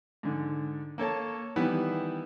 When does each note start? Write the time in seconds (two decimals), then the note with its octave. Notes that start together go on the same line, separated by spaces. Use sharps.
0.23 G#2 D3
0.98 A#3 A4 C#5 A5
1.56 D#3 E3 G3 B3 E4